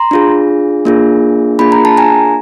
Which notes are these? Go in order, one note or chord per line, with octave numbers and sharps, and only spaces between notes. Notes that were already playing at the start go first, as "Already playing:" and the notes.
Already playing: A#5 C6
D4 F4 G#4
A#3 D4 F4 G#4
A#3 D4 F4 G#4 B5
A#5
A5
G#5 A#5